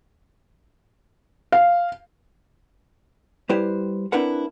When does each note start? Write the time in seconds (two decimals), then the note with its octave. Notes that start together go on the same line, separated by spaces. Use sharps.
1.52 F5
3.49 G3 E4 G4 B4 C5
4.12 C4 D4 E4 A#4 B4 F#5